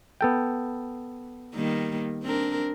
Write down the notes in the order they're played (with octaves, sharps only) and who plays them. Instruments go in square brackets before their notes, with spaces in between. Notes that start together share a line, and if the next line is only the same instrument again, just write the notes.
[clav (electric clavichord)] B3 A4 G5
[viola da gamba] D#3 G3 A#3
C4 D4 A#4